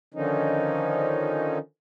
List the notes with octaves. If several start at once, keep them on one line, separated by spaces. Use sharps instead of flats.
D3 D#3 F3 C#4 D#4